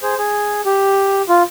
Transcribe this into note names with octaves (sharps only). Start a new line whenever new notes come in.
G#4 C5
G#4
G4
F4